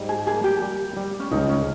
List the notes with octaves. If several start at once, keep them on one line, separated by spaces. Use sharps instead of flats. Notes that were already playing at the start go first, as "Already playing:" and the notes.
Already playing: G#2 G3
G#4
A#3 G#4
G4
G3
G3
C#4
C#2 D#4
C#4